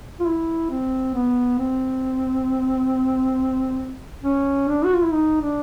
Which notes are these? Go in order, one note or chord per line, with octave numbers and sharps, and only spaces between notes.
F4
E4
C4
B3
C4
C#4
D4
F#4
F4
E4
D#4
D4